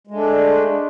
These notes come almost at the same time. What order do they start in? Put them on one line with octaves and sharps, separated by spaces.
G#3 A3 D4